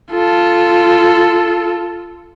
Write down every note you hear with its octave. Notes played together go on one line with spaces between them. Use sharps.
F4 A4